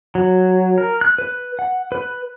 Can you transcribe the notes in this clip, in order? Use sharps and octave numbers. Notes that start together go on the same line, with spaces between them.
F#3
A#4
F#6
B4
F#5
B4